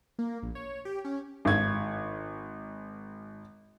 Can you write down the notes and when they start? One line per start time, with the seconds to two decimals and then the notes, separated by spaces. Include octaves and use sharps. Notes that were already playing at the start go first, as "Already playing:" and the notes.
0.19 A#3
0.42 A#1
0.55 C#5
0.85 G4
1.05 C#4
1.45 G#1 G#6